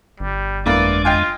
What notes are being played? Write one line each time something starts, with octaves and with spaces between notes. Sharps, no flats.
G1 G3
F2 E3 G#3 A#3 D4 D5
F4 D#5 G5 G#5